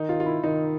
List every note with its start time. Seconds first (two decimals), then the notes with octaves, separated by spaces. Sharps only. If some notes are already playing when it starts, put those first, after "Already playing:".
Already playing: D#3 D#4
0.09 F4
0.20 F4
0.26 E4
0.44 D#3 D#4